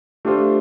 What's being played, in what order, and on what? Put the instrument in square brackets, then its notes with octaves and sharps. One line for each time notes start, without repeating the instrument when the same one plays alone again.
[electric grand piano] A3 D4 F4 C5 [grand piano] G4